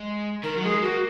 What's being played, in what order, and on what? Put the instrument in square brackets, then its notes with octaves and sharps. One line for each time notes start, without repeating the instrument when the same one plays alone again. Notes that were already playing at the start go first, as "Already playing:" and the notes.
Already playing: [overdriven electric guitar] G#3
[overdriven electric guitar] D#3 [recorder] A#4
[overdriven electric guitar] F#3
[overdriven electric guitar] G#3 [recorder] G#4
[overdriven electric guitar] A#3 [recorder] F#4